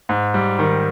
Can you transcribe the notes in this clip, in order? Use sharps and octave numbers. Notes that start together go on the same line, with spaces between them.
G#2
G3
D#3